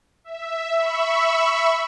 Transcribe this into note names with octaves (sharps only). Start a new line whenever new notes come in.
E5
E5 B5 C#6 E6